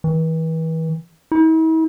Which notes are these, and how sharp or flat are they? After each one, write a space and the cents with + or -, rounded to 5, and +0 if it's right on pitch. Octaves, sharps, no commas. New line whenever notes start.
E3 -35
E4 -45